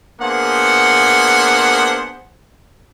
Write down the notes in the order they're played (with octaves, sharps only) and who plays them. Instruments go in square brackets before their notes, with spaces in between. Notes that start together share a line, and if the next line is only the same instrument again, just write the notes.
[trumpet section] A#3 B3 D4 G#4 C5 F#5